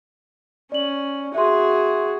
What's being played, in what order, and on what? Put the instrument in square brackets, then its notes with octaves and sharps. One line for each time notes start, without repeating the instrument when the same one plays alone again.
[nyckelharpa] C#4 [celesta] D5 F#7
[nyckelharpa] F#4 G#4 [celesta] E5 C6